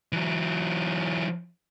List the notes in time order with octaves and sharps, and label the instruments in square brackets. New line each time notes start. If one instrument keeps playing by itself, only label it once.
[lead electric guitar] E3 F#3